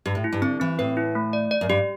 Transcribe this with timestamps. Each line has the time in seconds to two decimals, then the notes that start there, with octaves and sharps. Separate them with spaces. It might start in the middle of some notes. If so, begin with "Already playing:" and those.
0.06 G2 G4
0.15 A2
0.24 E4
0.32 G2
0.42 D3 C4
0.60 E3 C4
0.79 A2 B4
0.97 E4
1.15 A3
1.33 D5
1.51 D5
1.61 F#2
1.69 G2 G4